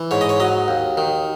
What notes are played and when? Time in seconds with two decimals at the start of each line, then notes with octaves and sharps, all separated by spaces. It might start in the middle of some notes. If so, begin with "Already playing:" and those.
Already playing: E3
0.11 G#2 C#5
0.21 D#5
0.29 C#5
0.40 F#3 D#5
0.68 D#2
0.97 D#3